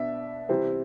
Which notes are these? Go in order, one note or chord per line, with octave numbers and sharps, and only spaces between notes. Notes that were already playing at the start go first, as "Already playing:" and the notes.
Already playing: B2 B3 D4 E5
C3 E3 G3 C4